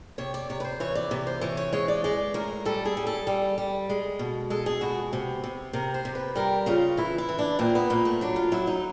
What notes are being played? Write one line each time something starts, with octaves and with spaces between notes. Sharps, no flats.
C3 C#5
D5
C3 C#5
B4
C5
E3 C#5
D5
C3
C5
E3 C#5
C#5
G#3 C#5
D5
G#3 D5
A2 A#4
G3 A4
G#4
G3
A4
G3
G3
G#3
B2
G#3 A4
G#4
B2 F#4
C3
C3
C3 A#4
C5
C3
B4
G3 A#4
C#3 F4
E3 E4
E4
E3
D4
A#2 C4
B3
A#2 A#3
A3
F#3 D4
F4
F#3 E4
D#4